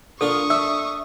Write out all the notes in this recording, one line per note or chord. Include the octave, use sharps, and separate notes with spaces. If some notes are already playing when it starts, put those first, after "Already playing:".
A#3 D4 F4 A4 C#6 D#6
D4 E5 E6